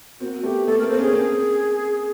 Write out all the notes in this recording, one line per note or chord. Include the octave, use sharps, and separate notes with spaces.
A#3 C4 F#4
A3 B3 G4
A3 B3 A4
A#3 C4 A#4
C4 C5
B3 C#4
G#4
A#3 C4